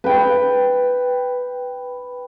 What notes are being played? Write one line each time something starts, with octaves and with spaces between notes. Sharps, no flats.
B4 G5